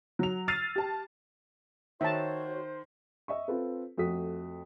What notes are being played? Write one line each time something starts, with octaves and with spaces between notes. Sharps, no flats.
F#3 F7
E6 F6 A6 C7 D#7 F7
G4 A5
D#3 F#4 C5 C#5 E5 A5
D#5 E5 C#6
C4 F4 A4 B4
F2 A3 F#4 D#6 B6